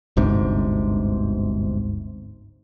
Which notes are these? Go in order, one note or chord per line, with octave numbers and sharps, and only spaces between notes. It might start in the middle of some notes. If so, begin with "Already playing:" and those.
G1 D2 G#2 C3